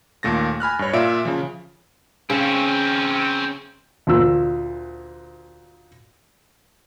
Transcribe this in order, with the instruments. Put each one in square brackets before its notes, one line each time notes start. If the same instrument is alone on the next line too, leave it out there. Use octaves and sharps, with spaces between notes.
[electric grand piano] D#2 A#2 A3 A6 A#6
G#5 B5 F6 F#6
G2 C#5
A#2 F4 D5 E5 D7
C#3 F3
[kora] C#3 [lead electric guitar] C4 C#4
[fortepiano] D2 A#2 E6